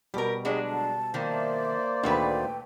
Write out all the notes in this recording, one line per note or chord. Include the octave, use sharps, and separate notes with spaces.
B2 G3 G4 A#4
F#3 G#3 D4 G4 G#4 D#5
D3 A5
D#3 F3 A#3 C5 D5
E5
D2 A#2 D3 D#3 A3 B4 G5